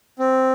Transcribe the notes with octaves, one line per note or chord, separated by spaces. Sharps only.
C4